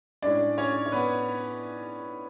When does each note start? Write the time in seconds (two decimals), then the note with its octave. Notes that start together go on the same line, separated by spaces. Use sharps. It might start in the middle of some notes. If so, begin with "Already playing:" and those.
0.22 A2 G#3 C#4 D4 D5
0.58 C#4 C#5
0.86 C#5
0.92 B3 B4